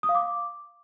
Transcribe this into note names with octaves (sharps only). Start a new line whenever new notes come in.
D#6
F5
D6